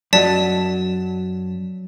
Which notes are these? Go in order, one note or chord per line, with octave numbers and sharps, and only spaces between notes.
F#2 F#3 D5 D#5 A5 B6